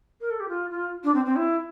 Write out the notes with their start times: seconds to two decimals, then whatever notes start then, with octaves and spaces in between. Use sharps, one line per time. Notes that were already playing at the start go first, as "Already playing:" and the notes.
0.21 A#4
0.31 A4
0.40 G4
0.49 F4
0.70 F4
1.04 D4
1.14 C4
1.25 C4
1.36 E4